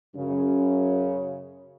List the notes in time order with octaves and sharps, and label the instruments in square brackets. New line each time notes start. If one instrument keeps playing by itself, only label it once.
[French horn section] F#2 C#3 C#4